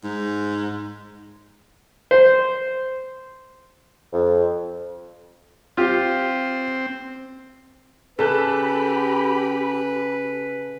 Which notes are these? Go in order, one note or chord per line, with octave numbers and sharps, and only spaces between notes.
G#2
C5
F2
C4 F4 G4
C#3 G4 A4 B4 A5 B5 F#6